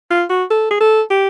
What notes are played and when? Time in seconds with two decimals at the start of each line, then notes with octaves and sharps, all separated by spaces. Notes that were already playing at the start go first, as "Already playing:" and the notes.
0.10 F4
0.30 F#4
0.50 A4
0.71 G#4
0.80 A4
1.10 G4